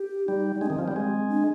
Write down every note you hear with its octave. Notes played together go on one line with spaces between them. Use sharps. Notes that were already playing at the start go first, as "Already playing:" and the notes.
Already playing: G4
G3 D#4
G#3 D4
D#3 C4
F3
G3
G#3
D4